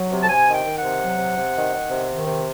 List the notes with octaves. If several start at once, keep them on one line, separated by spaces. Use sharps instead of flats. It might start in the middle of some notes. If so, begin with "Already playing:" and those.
Already playing: F#3
C3
A5
C3 G#5
D#3
G5
D#3
F#5
C3
F#3
C3
C3
D#3
D#3
C3
D#3
C3